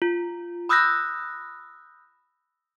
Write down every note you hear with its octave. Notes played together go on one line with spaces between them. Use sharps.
F4
B5 D#6 E6 F#6 G6 A#6